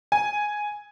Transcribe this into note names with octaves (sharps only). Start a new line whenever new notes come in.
G#5